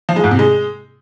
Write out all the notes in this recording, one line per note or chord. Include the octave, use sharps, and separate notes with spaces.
F3
G#3
G#2
C3
G#3